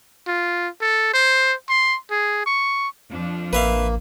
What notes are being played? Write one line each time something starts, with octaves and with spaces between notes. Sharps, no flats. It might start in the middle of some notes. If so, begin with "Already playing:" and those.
F4
A4
C5
C6
G#4
C#6
F2 F3 D4
A1 A#3 B4 E5 F5